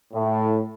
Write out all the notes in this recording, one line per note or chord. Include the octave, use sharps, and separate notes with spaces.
A2